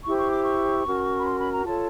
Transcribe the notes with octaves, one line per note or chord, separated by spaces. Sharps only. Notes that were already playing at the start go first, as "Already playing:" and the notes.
E4 G4 C5 C#6
C#6
D6
C#6
C#4 F#4 A#4
B5
C6
B5
A#5
F4 A4 C#5 A5